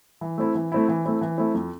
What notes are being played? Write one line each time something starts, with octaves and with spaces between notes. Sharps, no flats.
E3
A3 C4 E4
E3
A3 C4 E4
E3
A3 C4 E4
E3
A3 C4 E4
F2